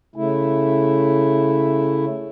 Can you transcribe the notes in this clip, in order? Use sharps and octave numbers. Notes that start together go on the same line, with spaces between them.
C#3 A3 E4